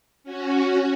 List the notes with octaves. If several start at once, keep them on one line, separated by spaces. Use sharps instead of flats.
C#4 F#4